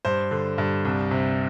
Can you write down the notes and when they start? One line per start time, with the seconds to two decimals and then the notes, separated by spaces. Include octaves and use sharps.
0.05 G2 C5
0.31 D3
0.58 G2
0.85 C2
1.11 C3